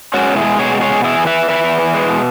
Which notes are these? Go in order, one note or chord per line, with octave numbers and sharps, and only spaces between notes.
G#3 C#4 F#4
B2
E4 G#4
G#3
B2 G#4 C#5
G#3
G#4 C#5
B2
E3 E4 G#4
E2
B4 E5
E2
E2 B4 E5
E2
E3
G#3
B2